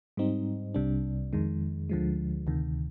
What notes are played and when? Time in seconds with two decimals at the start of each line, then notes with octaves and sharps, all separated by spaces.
0.17 G#2 G3 C4 D#4
0.74 C2 C3 G3 D4
1.33 F2 D#3 G#3
1.89 D2 D3 F3 G#3
2.47 D2 C3 D#3